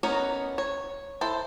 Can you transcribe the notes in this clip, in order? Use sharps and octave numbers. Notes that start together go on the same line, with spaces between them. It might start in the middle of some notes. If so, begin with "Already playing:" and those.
B3 C#4 D#4 A#4 C#5
C#5
E4 A4 C5